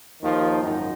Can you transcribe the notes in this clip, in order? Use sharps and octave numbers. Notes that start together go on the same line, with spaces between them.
D#2 D#3 F3
G#1 F#2 D#4